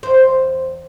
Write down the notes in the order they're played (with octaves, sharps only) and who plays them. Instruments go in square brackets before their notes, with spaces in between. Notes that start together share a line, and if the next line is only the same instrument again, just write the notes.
[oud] E2 C5